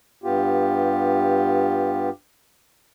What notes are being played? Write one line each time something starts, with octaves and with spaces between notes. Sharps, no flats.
G2 B3 F4 G4